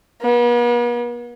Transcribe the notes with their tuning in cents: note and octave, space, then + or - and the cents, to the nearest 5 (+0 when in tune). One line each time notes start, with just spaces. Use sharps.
B3 -45